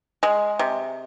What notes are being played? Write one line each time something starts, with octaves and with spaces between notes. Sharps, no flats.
G#3
C3